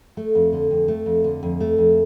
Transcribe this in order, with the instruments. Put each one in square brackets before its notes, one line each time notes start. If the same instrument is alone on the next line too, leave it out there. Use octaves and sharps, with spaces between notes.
[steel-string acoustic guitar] A3
F2
D3
F2
A3
F2
D3
F2
A3
F2